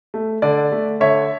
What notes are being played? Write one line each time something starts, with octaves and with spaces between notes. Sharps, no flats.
A3
D3 D5
A3
D3 C#5 E5